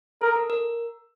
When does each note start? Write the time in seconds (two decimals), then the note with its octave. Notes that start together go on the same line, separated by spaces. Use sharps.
0.22 A4 A#4
0.36 A#4
0.50 A#4